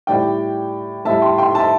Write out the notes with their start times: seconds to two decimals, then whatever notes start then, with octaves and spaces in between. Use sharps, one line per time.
0.07 A2 G3 D5 G5
1.05 A2 G3 E5 A5
1.22 G5 C6
1.38 G5 C6
1.55 E5 A5